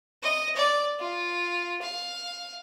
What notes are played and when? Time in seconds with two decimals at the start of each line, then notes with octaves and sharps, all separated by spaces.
0.23 D#5
0.56 D5
1.00 F4
1.81 F5